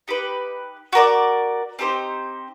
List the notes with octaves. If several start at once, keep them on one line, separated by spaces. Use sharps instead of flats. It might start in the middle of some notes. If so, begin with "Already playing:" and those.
D#4 G4 B4
F#4 A#4 D5
C4 D#4 G4 C5